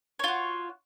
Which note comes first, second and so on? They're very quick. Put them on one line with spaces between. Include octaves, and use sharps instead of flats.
C#5 F4 F#4